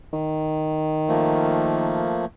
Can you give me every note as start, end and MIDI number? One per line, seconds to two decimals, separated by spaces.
0.13 2.14 51
1.08 2.25 53
1.08 2.25 57
1.08 2.25 58